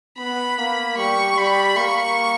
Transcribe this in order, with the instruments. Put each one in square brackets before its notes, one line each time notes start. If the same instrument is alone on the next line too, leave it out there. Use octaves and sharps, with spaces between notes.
[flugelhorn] B3 [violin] B5
[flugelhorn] A#3
[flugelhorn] G3 [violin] C#6
[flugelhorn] G3 [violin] B5
[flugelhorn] A#3 [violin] C#6